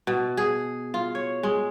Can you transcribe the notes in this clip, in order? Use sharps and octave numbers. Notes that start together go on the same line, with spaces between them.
B2
G#4
F4
C#5
G#3